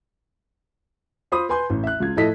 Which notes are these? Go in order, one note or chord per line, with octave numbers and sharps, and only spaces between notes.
F4 C5 B5 C6 D#6
B4 G#5 C6 G6
A1
E5 F#6
C#2 F4 G#6
A2 F3 E4 A4 D#5 B6